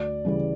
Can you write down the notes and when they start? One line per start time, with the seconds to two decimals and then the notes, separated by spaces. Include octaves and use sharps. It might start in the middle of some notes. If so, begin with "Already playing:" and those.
Already playing: D2 D5
0.25 C#3 E3 G3